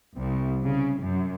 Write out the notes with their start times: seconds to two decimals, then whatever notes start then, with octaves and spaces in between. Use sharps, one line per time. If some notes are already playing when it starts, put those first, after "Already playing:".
0.17 C2
0.63 C#3
1.00 F#2